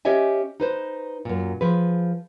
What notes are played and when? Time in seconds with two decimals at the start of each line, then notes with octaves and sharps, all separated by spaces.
0.05 C#4 G4 C#5 D#5 E5 G#5
0.60 D#4 B4 C5
1.25 F#2 A#2
1.61 F3 G#4 B4